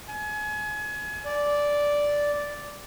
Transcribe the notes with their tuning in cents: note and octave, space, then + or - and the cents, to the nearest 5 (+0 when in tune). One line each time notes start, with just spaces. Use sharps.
G#5 +30
D5 -5